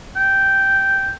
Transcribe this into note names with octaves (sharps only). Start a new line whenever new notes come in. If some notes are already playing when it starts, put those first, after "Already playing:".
G5